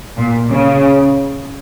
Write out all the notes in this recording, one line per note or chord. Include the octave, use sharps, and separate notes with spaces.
A#2
C#3